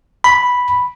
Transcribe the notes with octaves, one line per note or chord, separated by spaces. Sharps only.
B5